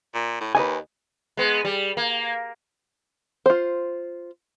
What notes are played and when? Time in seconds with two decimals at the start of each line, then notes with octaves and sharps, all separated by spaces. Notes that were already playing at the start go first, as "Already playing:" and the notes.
0.14 A#2
0.40 A2
0.55 D#2 B4 D#5 G#5
1.37 G#3 B3
1.65 G3
1.97 A#3
3.46 F4 C5